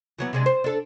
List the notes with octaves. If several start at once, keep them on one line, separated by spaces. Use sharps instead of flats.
E3 F#3 B3
C3 G#3 D4
C5
D4 A4